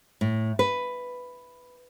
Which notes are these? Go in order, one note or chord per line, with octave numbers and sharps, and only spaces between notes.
A2
B4